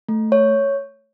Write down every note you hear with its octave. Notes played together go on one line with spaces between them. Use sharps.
A3
C#5